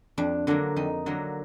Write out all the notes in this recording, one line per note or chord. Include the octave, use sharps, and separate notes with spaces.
F2 D4
D3 F#3 A#3 D4
F2 D#4
D3 F#3 A#3